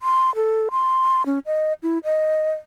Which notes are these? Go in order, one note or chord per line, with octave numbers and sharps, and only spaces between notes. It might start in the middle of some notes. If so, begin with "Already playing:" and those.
C6
A4
C6
C#4
D#5
E4
D#5